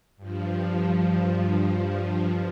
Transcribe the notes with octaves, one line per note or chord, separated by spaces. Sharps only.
G2 F3